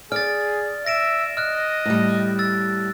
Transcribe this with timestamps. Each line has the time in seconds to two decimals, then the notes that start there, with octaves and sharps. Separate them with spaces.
0.12 G#4 D5 F6 A6
0.87 E5 A#6 D7 E7
1.37 D#5 F6 F#6
1.85 A2 G3
2.39 E6 A6